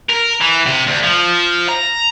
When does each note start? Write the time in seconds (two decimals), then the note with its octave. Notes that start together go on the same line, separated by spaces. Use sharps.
0.10 A#4
0.41 E3
0.66 C3
0.87 D2
1.03 F3
1.69 A#5